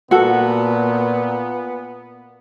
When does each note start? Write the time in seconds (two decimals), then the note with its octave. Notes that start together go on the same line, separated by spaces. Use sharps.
0.11 A#2 B3 F#4 A4